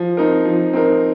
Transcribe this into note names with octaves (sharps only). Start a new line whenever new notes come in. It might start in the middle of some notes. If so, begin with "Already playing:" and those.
Already playing: F3
C4 D#4 A#4
F3
C4 D#4 A#4